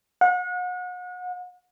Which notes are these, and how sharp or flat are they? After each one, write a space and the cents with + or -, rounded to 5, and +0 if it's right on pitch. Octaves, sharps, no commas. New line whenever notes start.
F#5 -35